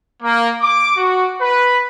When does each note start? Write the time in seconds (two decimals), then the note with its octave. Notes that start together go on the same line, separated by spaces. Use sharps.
0.23 A#3
0.61 D6
0.96 F#4
1.41 B4